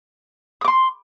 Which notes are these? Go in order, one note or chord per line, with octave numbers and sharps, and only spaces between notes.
C6 D6 D#6